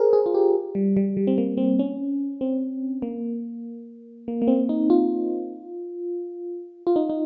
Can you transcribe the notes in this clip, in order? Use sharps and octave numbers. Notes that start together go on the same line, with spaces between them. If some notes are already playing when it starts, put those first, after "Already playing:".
Already playing: G#4 A#4 C5
G#4
F4
G4
G3
G3
G3
C4
A#3
C4
C#4
C4
A#3
A#3
A#3
C4
D#4
F4
F4
D#4
D#4